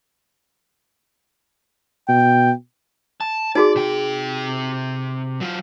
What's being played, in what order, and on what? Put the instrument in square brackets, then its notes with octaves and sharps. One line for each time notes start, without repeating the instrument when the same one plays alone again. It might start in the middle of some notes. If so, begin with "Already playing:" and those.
[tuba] B2 [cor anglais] G5
[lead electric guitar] A5
[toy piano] D#4 F#4 G#4 [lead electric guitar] D5
[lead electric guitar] C3 G5
F#3 F4